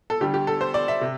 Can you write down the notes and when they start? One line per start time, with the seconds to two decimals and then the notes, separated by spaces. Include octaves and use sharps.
0.10 A4
0.21 D2 D3 G3 G4
0.34 G4
0.47 A4
0.61 C5
0.74 D5
0.88 E5
1.01 C3